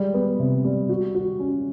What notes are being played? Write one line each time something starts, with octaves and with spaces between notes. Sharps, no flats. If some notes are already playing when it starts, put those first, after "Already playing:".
Already playing: G3 G#3
B3
C3
G3
F#4
F#4
C#4